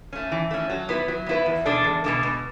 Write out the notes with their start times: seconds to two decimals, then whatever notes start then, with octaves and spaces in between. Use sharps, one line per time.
0.13 A3 C#4
0.32 E3
0.51 A3 C#4
0.70 F#3
0.89 B3 E4 B4
1.08 F#3
1.26 B3 E4 B4
1.46 E2
1.65 B2 G#3 D4 A4
1.84 E2
2.04 B2 G#3 D4 A4
2.23 B2